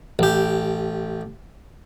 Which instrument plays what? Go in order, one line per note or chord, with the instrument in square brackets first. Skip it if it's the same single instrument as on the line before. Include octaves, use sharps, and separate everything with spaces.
[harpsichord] A1 G4